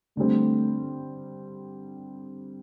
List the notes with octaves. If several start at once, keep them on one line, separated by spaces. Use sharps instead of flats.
D3 G3 A3 C4